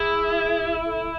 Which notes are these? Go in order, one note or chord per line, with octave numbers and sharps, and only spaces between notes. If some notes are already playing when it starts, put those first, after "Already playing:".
Already playing: E4 G#4
A4